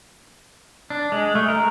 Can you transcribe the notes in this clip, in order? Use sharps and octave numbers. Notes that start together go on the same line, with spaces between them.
D4
G#3
A3
A#4